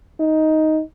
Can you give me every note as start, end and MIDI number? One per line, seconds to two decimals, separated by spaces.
0.20 0.81 63